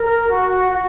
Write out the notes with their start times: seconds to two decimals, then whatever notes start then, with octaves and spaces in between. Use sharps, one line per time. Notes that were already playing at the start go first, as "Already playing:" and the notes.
Already playing: A#4
0.28 F#4
0.72 F#4